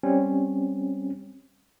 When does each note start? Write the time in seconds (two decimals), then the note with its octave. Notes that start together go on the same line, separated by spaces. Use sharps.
0.03 G3 C4 C#4